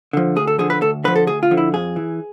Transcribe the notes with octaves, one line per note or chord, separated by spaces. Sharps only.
D3 F3
D2 G#4
A4
D3 F3 G#4
B4
D2 A4
D3 F3 B4
A4
D2 G#4
F4
D3 F3
E4
F2 G#4
E3